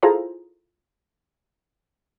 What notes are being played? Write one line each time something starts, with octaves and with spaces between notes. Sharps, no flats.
E4 F4 G#4 A4 C5 A#5